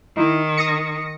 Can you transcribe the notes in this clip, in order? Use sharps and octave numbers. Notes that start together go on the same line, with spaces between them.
D#3 D#4 E4
D#6 A#6 C#7